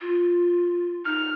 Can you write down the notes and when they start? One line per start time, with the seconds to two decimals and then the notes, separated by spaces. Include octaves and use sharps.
0.01 F4
1.05 D#4 F6